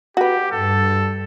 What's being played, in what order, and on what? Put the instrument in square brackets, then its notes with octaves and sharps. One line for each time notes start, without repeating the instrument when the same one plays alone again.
[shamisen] F#4 B4 [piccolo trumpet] G4
[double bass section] G2 [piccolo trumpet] A4